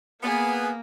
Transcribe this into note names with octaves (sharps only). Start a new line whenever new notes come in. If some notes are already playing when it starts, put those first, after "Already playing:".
A#3 B3 G#4